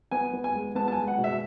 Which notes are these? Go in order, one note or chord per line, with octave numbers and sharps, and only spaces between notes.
B3 G#5
B3
G#5
G#3
B3 A5
A5
G#5
G#3
F#5
B2
E5